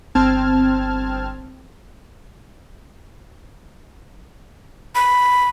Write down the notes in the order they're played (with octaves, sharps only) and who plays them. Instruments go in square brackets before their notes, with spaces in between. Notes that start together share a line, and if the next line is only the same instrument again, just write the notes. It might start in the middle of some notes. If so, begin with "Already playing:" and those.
[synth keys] G1 C4 A5 F6 G#6
[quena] B5